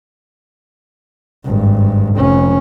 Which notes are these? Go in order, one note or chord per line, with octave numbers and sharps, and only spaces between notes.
G#1 G2
F1 C#4